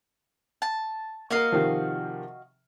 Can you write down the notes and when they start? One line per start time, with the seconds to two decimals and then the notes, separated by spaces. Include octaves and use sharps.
0.62 A5
1.30 A#3 F#4 A#4 D#5 F5
1.52 C3 D#3 F3